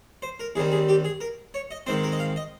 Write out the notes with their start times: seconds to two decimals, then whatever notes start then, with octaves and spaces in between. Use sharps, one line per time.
0.22 C5
0.40 A#4
0.55 D#2 D#3 G3 C4 G#4
0.72 G#4
0.89 G4
1.05 G#4
1.21 A#4
1.54 C#5
1.71 D#5
1.86 G#2 D#3 G#3 C4 C5
2.03 A#4
2.12 D#5
2.19 F5
2.36 D#5